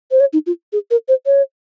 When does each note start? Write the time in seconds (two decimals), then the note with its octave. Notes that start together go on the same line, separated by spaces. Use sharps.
0.11 C5
0.20 C#5
0.33 D#4
0.46 F4
0.72 G#4
0.91 A#4
1.08 C5
1.26 C#5